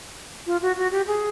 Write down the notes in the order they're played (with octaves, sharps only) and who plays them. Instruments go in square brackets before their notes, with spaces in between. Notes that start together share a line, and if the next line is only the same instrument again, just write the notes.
[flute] F4
F#4
F#4
G4
G#4